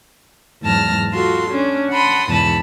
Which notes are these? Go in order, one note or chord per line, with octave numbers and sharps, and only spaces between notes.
E2 G#2 F#3 A5 F6 A#6
F4 F#4 A4 C6
C#4 D4
F#5 A5 B5 C6 D#6
E2 G#2 B2 A5 B5